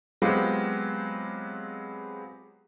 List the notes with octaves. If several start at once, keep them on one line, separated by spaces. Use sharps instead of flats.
F#3 G#3 B3 C4 F4 G4